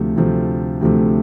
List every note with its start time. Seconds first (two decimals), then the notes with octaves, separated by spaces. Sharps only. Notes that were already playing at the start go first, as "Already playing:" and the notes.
Already playing: D2 C3 F3 A3
0.16 D2 C3 F3 A3
0.81 D2 C3 F3 A3